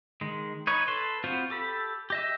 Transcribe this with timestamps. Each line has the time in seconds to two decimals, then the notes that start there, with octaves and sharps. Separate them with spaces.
0.21 D#3 G#3
0.67 D#4 B4 C#5
0.88 A4 B4 A5 C6
1.24 B3 C4 F4 F#4 C5
1.50 G4 A4 B5
2.10 G4 D#5 E5